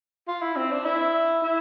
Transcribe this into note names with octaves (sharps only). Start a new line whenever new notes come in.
F4
E4
C4
D4
E4
E4